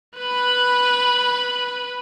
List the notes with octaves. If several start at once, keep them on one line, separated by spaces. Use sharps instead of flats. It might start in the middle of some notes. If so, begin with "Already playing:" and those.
B4 B5